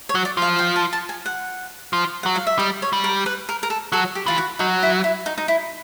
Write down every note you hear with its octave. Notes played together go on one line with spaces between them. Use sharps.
C#5
F#3
D5
F3 F5
G5
A5
A5
G#5
F#5
F3
F#3 F#5
F5
E5
G3 D#5
C#5
G3
A#4
B4
A#4
A#4
A4
F#3 A4
G4
E3 F4
F#4
F#3 D#4
E4
E4
D#4
D#4
E4